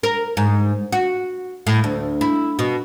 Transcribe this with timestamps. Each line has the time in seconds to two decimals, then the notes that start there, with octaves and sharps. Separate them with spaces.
0.03 A#4
0.37 G#2
0.93 F#4
1.67 A2
1.84 D2
2.21 E4
2.59 B2